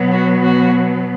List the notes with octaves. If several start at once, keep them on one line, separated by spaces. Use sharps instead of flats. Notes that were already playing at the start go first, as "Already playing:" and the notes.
Already playing: B2 F#3 B3
F#4
F#4